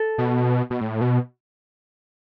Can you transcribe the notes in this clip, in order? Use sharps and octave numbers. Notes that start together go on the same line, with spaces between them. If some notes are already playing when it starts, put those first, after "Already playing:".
Already playing: A4
B2
B2
A2
B2